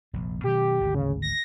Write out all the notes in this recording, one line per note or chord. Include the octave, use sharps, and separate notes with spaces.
F1 A#1 A#2
B2 D#3 F#3 G4
G#1 D2
C#3
A#6